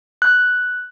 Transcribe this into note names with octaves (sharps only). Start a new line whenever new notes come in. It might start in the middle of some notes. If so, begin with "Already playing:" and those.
F#6